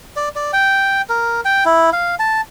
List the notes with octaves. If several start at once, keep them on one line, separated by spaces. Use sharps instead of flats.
D5
D5
G5
A#4
G5
E4
F5
A5